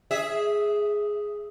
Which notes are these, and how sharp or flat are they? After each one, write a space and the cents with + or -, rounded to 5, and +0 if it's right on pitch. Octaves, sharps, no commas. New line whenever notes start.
G#4 +0 E5 -15